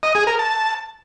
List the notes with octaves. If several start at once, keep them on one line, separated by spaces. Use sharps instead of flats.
D#5
G#4
A#4
A5